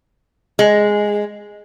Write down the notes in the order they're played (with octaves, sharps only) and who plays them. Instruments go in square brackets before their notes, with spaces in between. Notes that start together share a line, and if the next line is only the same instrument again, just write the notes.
[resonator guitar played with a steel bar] G#3